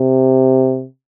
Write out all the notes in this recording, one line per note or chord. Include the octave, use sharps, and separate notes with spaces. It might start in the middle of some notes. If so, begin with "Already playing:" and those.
Already playing: C3